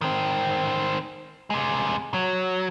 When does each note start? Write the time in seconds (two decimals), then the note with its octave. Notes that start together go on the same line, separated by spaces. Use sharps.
0.01 D#3 C4
1.50 C3 G#3
2.14 F#3